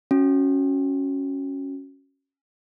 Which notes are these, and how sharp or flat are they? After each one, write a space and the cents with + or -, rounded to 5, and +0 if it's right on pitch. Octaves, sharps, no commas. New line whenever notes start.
C#4 -5 F#4 +0